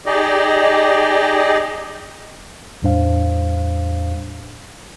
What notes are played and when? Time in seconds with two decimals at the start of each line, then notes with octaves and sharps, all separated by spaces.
0.06 D#4 G4 G#4 D5 D#5
2.82 E2 A2 G3 D4 C5 F5